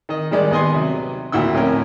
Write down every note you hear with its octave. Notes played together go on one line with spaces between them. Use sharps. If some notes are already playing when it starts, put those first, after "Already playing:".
D#3 D#5
D#3 G3 G#3 D5
D#2 B3 D#5 G#5 C6
C3 F#3
D2 A#2 E4 F#4 G5 E6
F2 A2 C#4 A#4